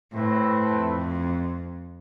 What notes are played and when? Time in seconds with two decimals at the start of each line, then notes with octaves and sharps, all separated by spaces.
0.11 A2 A3 C4 E4 B4
0.73 F2